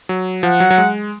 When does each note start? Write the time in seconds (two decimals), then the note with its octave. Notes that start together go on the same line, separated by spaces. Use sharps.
0.09 F#3
0.43 F3 F#5
0.60 F#3
0.70 F#3
0.78 G#3